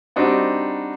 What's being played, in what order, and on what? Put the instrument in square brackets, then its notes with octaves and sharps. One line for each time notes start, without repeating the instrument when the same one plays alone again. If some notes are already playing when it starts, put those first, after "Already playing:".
[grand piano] G3 C4 D4 D#4 F#4